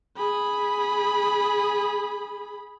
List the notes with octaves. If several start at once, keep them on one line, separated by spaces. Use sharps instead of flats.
G#4 B5